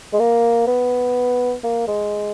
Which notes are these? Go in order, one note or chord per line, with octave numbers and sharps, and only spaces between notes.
G#3
A#3
B3
A#3
G#3